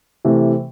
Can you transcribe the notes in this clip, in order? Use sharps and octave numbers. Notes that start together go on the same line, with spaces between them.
C3 E3 A3